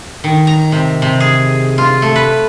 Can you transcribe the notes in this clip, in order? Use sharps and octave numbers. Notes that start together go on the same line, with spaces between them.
D#3
A#5
C3
C3
G#4
F4
A3
B4